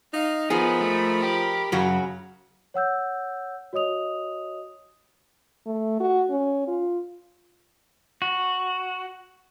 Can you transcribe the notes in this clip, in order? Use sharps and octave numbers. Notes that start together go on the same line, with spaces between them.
D#4 F5
F3 B3 D#4 G#4 A#4 B5
A3
G4
F#2 C#3 F#3 F#4
C#5 F#5 E6 G6
F#4 C#5 D#5 D#6 F7
A3
F#4
C#4
F4
F#4